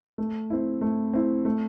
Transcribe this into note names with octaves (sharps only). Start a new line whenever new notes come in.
A3
C4 E4
A3
C4 E4
A3